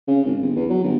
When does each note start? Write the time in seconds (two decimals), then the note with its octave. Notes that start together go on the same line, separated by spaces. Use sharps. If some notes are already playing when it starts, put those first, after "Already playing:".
0.08 C#3
0.25 G#1
0.42 G1
0.56 E2
0.70 F#3
0.84 G1